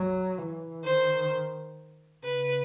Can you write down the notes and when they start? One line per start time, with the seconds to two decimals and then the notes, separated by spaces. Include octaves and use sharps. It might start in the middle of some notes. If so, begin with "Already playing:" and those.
Already playing: F#3
0.38 E3
0.84 D#3 C5
2.24 C#3 B4